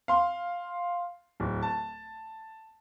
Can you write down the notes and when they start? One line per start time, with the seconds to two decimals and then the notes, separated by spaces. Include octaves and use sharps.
0.08 F5 C6
1.40 D1
1.62 A5